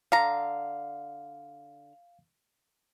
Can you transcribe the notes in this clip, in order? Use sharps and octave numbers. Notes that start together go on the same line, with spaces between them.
D3 F5 A#5